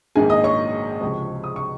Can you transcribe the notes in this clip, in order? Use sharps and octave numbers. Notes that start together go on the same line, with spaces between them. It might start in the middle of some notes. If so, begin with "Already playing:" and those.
A#1 G#2 D#3 A#3 G#4 G#5
D#5 D#6
C#5 C#6
C#2 C3 F3
D#6
C#6